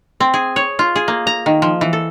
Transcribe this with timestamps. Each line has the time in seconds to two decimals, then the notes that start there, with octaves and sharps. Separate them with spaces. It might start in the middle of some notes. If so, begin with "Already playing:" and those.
0.20 C4
0.34 G#4
0.56 C#5
0.79 F4
0.96 G#4
1.08 A#3
1.27 A#5
1.46 D#3
1.62 F3
1.81 E3
1.93 A4